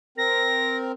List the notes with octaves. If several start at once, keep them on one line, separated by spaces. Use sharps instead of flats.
C4 A#4 A#6